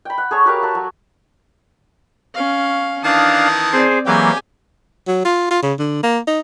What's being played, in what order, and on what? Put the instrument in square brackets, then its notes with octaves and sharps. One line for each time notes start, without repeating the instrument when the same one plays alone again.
[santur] G5 B5
F#5
G#4 A4 C#5 C#6
F#4 G4 A#4 F5
A4 F#5
F#3
[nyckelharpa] C#4 F5
[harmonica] D#3 E3 A5 [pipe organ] D4 F5 [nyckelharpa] D#6
[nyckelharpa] C4 D5 [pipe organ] G#4 C5
[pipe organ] E3 F#3 A#3 [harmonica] G4 G5 [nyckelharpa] G#4 G#5
[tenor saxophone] F#3
F4
F4
C#3
D3
A#3
D#4